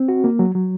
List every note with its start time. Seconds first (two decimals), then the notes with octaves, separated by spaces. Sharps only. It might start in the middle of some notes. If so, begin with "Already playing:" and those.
Already playing: C4
0.08 F#4
0.24 A#3
0.39 F#3
0.55 F#3